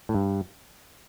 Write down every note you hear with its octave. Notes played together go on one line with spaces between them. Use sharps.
A2
G2